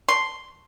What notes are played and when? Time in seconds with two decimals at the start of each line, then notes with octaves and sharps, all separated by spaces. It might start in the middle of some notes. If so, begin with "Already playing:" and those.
0.08 C6